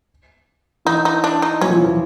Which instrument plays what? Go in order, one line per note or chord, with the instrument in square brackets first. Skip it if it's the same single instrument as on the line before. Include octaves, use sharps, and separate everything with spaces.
[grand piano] E3 [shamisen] D#4
[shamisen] D#4
D4
D#4
[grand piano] F#3 [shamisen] C#4
[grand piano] F3
E3
F3